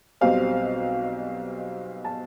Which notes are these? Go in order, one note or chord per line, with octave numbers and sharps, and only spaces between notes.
B1 B2 G3 C4 F5
A5